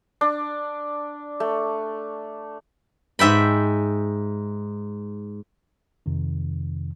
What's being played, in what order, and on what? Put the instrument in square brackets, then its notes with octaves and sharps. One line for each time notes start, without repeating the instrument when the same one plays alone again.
[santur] D4
A3
[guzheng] G#2 E5 G5 B5
[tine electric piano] F2 C3 D#3